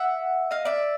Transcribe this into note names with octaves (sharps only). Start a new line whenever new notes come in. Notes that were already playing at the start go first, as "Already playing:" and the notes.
Already playing: E5 F#5
D#5 F5
D5 E5